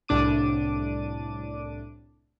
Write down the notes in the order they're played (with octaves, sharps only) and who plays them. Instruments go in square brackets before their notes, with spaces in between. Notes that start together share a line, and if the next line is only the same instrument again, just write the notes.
[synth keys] C2 A2 D4 D6 D#7